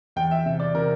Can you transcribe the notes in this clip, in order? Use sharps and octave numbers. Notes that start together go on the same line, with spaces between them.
E2 G5
E5
C3 E5
D5
C3 A#4